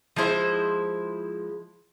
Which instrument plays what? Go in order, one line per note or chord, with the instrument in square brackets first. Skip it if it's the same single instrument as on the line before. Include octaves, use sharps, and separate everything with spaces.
[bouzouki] F3 G#3 E4 C5